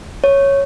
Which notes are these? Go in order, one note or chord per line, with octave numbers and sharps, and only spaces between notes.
C#5